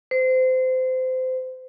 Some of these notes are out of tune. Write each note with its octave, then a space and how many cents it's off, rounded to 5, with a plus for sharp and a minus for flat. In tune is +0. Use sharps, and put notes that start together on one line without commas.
C5 -25